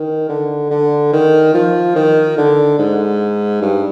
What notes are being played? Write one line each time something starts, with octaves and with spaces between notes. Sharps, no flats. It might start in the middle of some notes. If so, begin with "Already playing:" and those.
Already playing: D#3
D3
D3
D#3
F3
D#3
D3
G#2
G2